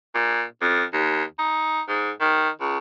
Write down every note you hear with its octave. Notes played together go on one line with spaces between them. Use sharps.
A#2
F2
D#2
D#4
G#2
D#3
C#2